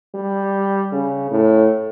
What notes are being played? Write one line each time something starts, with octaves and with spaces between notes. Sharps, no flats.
G3
C#3
A2